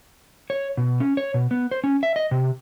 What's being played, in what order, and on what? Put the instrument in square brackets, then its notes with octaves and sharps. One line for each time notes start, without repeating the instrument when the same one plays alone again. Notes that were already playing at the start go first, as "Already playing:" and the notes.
[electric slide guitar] C#5
B2
C#4
C#5
B2
B3
C5
C#4
E5
D#5
C3